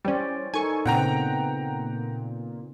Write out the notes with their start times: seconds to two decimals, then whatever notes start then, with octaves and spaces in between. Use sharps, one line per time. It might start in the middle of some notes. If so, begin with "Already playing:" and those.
0.05 E3 G3 C#4 C5 D5
0.54 D#4 A4 A#4 G#5 C#6
0.86 A#2 C#3 B3 C4 F#5 G5 A#5